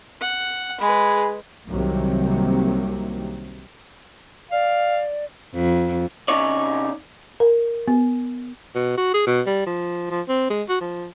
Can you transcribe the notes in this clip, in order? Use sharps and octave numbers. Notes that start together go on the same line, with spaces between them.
F#5
G#3 G#4 B4 B5
C2 C3 D#3 F#3 A#3
D5 F5
F2
C3 C#4 D#4 C#5 D5
A#4
B3
B2
F#4
G#4
B2
G3
F3
F3
C4
G#3
F#4
F3